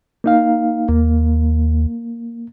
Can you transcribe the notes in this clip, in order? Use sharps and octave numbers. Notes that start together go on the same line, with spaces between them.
A#3 D#4 F5
D#2 A#3